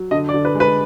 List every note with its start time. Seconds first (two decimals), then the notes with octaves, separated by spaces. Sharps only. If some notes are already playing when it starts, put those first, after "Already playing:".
Already playing: F#3
0.11 D3 D#5
0.29 D5
0.34 D3
0.45 B4
0.55 G#3
0.60 B4